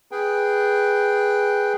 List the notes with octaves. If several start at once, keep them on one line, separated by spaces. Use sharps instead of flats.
G#4 B4 G5